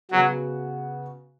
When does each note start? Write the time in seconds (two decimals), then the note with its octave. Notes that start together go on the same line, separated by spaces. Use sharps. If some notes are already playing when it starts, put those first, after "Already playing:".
0.11 C#3 F#3 B3 F#4